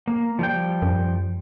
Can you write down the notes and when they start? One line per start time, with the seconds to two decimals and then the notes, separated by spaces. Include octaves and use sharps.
0.08 A#3
0.39 F3 G3 G5
0.82 F#2